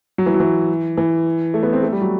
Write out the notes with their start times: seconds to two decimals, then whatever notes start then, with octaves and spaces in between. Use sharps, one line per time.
0.18 F#3
0.26 E3
0.34 F#3
0.40 E3
0.98 E3
1.54 A3
1.63 B3
1.73 C4
1.83 A3
1.92 G3
2.01 F#3